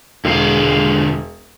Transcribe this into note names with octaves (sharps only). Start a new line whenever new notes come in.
E1 D3 G#3 F5